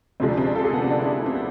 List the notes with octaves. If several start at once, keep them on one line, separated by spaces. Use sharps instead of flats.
D2 C3 F3 G#3 C4
D4
C4
D4
A4
G#4
B3
C4
D4
E4
D4
C4
B3